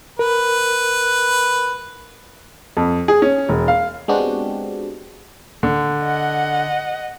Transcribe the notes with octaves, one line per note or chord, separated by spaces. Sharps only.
A#4 B4
F2
G#4
C#4
E1
F5
G#3 B3 C4 D4 F#4 G4
D3
D#5 F#5